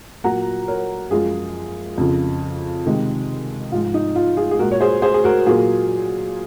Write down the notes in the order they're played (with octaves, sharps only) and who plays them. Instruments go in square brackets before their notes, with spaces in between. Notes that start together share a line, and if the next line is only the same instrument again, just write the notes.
[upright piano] A#2 F#3 A#3 F#5 A#5
A#4 C#5
F#2 F3 G#3 F4 G#4
F2 C#3 F3
C3 D#3 G#3
G#2 F3 G#3 F4
D#4
F4
F4 G#4
G#4
A#2 G#3 F#4 A#4
C#5
G#4 C5
G#4 C5
G#4
F#4 A#4
A#2 F#3 A#3 F4 G#4